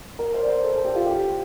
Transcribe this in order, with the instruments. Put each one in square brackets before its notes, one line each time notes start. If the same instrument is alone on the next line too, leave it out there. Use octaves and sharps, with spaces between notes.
[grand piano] A#4
C5
D5
C5
A4
A4
G4
F4
G4